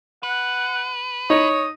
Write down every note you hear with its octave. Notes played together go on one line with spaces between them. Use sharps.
B4 F#5
D#4 C#5 D#6